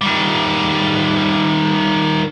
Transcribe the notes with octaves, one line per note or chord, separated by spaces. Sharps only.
D#3 G3